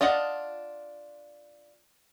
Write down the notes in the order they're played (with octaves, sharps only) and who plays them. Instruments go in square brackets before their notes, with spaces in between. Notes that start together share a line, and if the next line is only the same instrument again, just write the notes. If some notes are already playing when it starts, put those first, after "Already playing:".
[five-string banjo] D4 F4 D#5 F#5